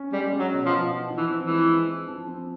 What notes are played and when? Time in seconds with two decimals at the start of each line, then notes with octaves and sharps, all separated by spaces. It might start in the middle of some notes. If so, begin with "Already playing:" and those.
Already playing: C#4
0.12 G3 G#3
0.32 C#4
0.39 F#3
0.52 B2
0.65 F3
0.71 B2
0.91 F3
1.10 F3
1.17 E3
1.30 C4
1.43 E3
1.50 G#3
1.69 C4
1.90 F3
2.08 F3
2.28 C4